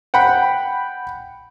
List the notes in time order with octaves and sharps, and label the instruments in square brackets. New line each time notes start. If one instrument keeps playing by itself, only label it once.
[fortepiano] F#5 G5 B5